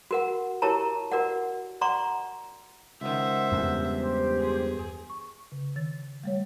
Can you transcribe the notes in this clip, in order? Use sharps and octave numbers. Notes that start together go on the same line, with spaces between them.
F#4 A#4 F#5
E4 G4 A#4 C#5 A5 A#5
F#4 A#4 D5 F#5
D5 F#5 A#5 C6 C#6
C#2 D#3 C5 E5 F#5
E2 G2
G4 C5
G#4
C#6
C#3
D#3 A6
G3 A3 C#5